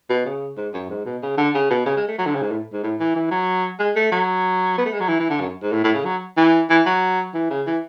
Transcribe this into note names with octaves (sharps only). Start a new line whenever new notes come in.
B2
C#3
G#2
F#2
G#2
B2
C#3
D3
C#3
B2
C#3
G#3
A3
F#3
D3
C#3
G#2
A2
G#2
A2
E3
E3
F#3
G#3
A3
F#3
B3
A3
G#3
F#3
E3
E3
D3
F#2
G#2
A2
A2
C#3
F#3
E3
E3
F#3
E3
C#3
E3